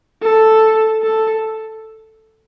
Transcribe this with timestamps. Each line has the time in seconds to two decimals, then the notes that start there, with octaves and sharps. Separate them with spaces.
0.23 A4
1.02 A4